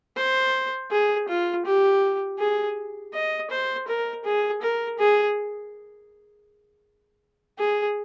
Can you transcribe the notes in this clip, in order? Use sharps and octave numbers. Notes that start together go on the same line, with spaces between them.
C5
G#4
F4
G4
G#4
D#5
C5
A#4
G#4
A#4
G#4
G#4